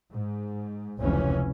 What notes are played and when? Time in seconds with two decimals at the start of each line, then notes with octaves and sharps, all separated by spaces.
0.13 G#2
1.00 F1 C#2 C3 E3 C#4